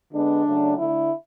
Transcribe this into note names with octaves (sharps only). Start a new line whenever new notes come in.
D3 G#3 B3 D4
C#3 F#3 A3
D3 A3 E4